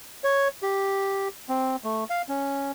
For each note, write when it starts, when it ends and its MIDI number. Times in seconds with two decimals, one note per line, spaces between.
0.24 0.48 73
0.63 1.28 67
1.49 1.76 60
1.84 2.04 57
2.10 2.22 77
2.29 2.72 61